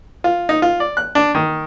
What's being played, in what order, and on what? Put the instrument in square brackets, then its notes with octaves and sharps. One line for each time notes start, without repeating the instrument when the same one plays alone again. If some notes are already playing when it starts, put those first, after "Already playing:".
[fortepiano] F4
D#4
F4
D5
F#6
D4
D#3